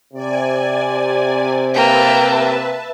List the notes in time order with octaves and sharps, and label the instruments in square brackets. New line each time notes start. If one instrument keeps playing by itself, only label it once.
[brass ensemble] C3 [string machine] D5 G#5
[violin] A#3 G5 [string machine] B4 E5 A5